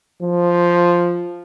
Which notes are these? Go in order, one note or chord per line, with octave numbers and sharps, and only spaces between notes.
F3